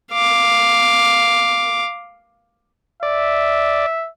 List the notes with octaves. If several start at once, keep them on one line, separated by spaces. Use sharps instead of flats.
F5 D6
D5 E5